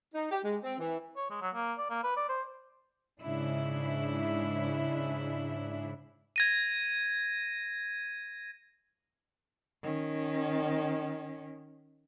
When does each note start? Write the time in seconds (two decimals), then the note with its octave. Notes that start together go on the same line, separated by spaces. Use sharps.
0.14 D#4
0.32 G4
0.44 G#3
0.63 C4
0.79 E3
1.17 C#5
1.30 G#3
1.42 F#3
1.55 A#3
1.78 D5
1.90 A#3
2.03 B4
2.17 D5
2.29 C5
3.21 G#2 C#3 D4 E4
6.36 G#6 A#6 D#7
9.83 D#3 C#4